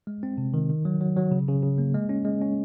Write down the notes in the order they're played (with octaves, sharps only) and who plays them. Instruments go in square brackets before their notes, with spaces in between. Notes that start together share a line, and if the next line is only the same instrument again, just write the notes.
[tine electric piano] G#3
C4
C3
D#3
D#3
F#3
F#3
F#3
C#3
C#3
C#3
A#3
G#3
C#4
G#3
C#4